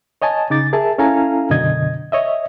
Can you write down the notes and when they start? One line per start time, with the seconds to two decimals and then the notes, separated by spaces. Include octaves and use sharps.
0.22 C#5 D#5 G#5 A5
0.50 C#3 D#4 D6 A6
0.73 G#4 A#4 E5 A5
0.98 C#4 E4 A4 F5 G#5 A#5
1.50 F#2 B2 D3 D#5 G#6
2.12 C#5 D#5 E5